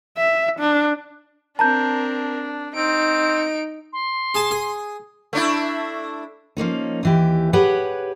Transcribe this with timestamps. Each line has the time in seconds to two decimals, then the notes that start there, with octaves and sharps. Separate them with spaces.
0.18 E5
0.60 D4
1.59 C4 D4 A#4 A5 A#5 G6
2.75 C4 D#4 D7
3.93 C6
4.35 G#4 A5
4.51 G#4
5.33 A3 D4 E4
6.57 F3 A#3 C#4 D#4
7.03 D#2 E3 G4
7.53 G4 G#4 B4 C#5 F#5